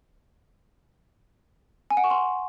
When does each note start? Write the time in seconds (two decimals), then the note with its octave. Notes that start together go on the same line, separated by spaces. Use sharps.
1.90 G#5
1.97 F#5
2.04 C#6
2.10 C6